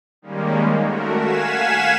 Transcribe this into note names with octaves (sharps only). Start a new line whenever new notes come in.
D#3 G3 G#3 A#3 C#4
A3 F#4 A#4
F5 F#5 G#5 G#6 B6 E7